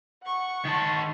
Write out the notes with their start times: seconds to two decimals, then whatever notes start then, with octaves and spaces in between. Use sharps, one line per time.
0.23 F#5 C#6
0.65 D#3 A5